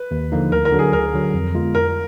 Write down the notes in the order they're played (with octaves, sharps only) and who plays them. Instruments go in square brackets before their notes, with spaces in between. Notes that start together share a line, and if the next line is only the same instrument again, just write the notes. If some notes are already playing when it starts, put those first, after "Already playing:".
Already playing: [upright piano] B4
[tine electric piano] D#2
D3 F3 A#3 D#4
[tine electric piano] D2 [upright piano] A#4
[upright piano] A#4
[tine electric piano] D3 F#3
[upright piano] G#4
[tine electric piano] D2 [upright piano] A#4
[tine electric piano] D3 F#3
F2
D3 G#3 B3 F4
[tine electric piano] F2 [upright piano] A#4